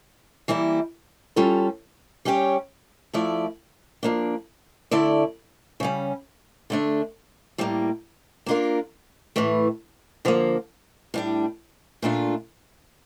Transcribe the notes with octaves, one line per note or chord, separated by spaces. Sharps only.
E3 G3 A#3 E4
G3 C#4 F4 A4
G3 C#4 G4 C#5
F3 A3 E4 A4 D5
F3 A#3 D4
D3 A3 E4 A4 D5
C#3 G3 C#4
D3 A3 D4
A2 G3 A#3
A#3 D4 F4 A#4
A2 E3 A3
D3 F3 A#3
A2 G3 D4
A#2 A3 D4 F4